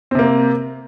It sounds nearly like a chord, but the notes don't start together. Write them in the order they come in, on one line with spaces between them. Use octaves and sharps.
C4 C3 A#3